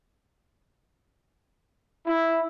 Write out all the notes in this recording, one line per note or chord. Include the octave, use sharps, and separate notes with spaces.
E4